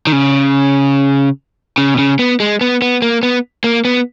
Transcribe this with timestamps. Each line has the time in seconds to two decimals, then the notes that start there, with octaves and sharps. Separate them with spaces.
0.07 D#3
0.12 C#3
1.78 C#3
1.94 B2
1.98 C#3
2.19 B3
2.40 G#3
2.61 B3
2.82 B3
3.02 A#3
3.23 B3
3.64 A#3
3.85 B3